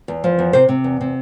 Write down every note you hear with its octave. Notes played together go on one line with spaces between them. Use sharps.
E2
F3
E2
C3 C5
C3
E2
C3